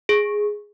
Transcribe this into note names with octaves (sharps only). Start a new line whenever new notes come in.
G#4